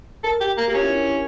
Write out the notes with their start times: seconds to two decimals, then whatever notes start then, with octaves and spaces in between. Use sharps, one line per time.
0.24 A4 A#4
0.41 G4
0.57 A#3
0.68 A#3 G4
0.75 C#4 F4
0.83 E4
0.92 D4